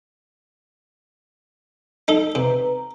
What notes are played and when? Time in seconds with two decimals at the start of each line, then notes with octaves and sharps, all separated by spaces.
2.08 D#4 A4
2.35 C3 B4 A#5